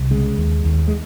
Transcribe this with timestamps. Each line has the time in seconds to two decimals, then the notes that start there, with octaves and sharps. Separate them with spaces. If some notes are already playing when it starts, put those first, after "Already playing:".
Already playing: C2
0.10 C#3 G#3
0.38 D#2
0.65 D#2
0.88 G#3